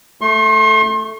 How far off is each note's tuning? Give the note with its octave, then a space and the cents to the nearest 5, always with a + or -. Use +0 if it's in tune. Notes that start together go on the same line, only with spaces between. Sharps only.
A3 +0 C6 +40